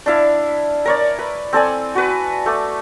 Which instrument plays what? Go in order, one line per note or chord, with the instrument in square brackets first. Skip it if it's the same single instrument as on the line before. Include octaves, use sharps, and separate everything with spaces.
[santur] D4 E4 F5
A#4 C#5 D5
B4
C4 A4 D5 G#5
F#4 B4
A3 D6